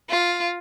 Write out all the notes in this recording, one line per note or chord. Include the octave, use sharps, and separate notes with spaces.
F4